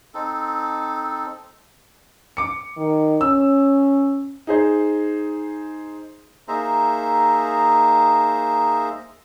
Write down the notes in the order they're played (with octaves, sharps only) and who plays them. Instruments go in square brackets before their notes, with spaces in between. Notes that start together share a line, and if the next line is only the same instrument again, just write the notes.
[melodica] C4 D#4 A4
[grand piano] D6 C#7
[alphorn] D#3
[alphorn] C#4 [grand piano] E6
[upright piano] D#4 G#4 C5
[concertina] A#3 D#4 G#4 C5 E5 A#5